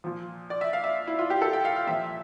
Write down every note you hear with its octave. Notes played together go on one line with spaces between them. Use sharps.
A#2 F3
D5
E5
F5
E5
E4
F4
G4
A4
G5
F5
F5
A#2 F3 E5